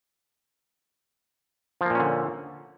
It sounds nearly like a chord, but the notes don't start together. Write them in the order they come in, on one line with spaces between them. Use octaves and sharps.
F3 A#3 A#2 C#4 D3